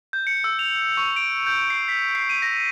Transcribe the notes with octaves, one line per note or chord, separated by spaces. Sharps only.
G6
C#7
E6
F7
C#6
D7
G6
C7
B6
C7
D#7
A#6